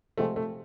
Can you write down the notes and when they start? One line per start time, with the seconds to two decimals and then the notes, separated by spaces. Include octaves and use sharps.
0.18 C3 F3 G#3 A3 C4
0.36 A3